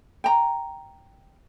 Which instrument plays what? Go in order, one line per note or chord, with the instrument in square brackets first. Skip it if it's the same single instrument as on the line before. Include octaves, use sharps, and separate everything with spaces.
[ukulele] G5 A#5